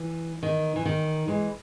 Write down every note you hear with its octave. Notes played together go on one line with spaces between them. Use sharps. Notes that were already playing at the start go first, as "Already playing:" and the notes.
Already playing: E3
D#3
E3
D#3
E3 G#3